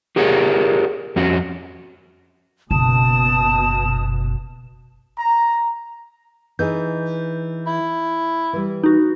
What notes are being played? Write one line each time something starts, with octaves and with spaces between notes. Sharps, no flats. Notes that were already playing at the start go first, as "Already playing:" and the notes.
G4 G#4 A#4 C#5 F#5
F2 C#4 F#4
F#1 B2 A5 D#6 E7
A#5
E3 D#4 G#4 G6
E4
E3 G3
D#4 F#4